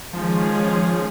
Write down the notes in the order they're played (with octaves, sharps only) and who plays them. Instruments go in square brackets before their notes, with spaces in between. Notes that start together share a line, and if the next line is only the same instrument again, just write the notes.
[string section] D#3 G#3 C#4 F4 G#4 [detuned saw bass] F3